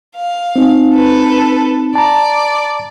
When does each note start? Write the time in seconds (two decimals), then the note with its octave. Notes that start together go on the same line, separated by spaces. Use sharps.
0.16 F5
0.56 C4 D#4
0.94 A4 B4
1.95 D5 A5 A#5